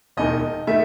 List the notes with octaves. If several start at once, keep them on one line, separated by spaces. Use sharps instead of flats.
E1 E2 D#3 D#5
D#3 A3 E5